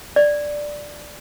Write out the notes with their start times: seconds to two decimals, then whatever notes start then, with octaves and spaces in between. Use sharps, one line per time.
0.16 D5